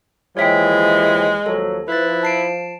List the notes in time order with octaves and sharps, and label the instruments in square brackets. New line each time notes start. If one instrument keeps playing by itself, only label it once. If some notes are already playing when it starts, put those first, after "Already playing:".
[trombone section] D#2 E3 F3 [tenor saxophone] G#3 [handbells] C#5 E5 G5
[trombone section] D#2 F3 F#3 [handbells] A4
[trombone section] F3 [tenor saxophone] E4 [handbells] B4 A6
[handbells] A5 C7 D7